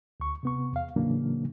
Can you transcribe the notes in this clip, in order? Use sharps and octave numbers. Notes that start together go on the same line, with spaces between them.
D2 C#6
C3 B3 C#6
E2 F5
A2 C#3 E3 F#3 A#3 D4